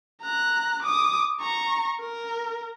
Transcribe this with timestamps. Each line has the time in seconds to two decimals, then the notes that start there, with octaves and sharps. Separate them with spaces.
0.22 A#5 F#6
0.83 D6 D#6
1.40 A#5 C#6
2.00 A#4